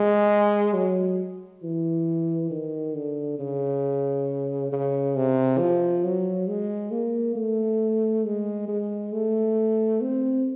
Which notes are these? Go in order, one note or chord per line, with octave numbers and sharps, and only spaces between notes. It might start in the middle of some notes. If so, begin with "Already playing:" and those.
Already playing: G#3
F#3
E3
D#3
D3
C#3
C#3
C3
F3
F#3
G#3
A#3
A3
G#3
G#3
A3
C4